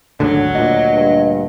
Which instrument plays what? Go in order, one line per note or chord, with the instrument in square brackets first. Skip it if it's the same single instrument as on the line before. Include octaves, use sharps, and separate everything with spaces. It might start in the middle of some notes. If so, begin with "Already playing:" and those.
[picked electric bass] G#1 D2 D3 [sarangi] F#3
[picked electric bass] D2 A#2 [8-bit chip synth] D#5
[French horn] G2